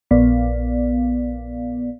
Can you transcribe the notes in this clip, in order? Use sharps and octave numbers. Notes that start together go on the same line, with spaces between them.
A#1 B3 D5 F5